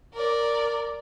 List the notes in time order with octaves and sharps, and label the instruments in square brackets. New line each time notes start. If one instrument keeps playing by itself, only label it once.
[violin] A#4 D5